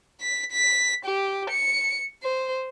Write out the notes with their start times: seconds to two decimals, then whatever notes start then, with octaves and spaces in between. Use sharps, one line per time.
0.21 B6
0.52 B6
1.05 G4
1.50 C#7
2.23 C5